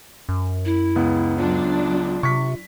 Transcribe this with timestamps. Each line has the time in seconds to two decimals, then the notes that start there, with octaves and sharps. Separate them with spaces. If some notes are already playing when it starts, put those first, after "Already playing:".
0.29 F#2
0.65 E4
0.96 C#2 B3
1.38 F#3 D4 F4
2.23 C3 C#6 B6